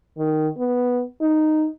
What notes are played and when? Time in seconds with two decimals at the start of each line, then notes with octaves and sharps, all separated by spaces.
0.18 D#3
0.57 B3
1.21 D#4